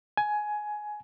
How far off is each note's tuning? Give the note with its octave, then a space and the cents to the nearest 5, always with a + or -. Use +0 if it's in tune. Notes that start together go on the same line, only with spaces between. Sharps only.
G#5 +15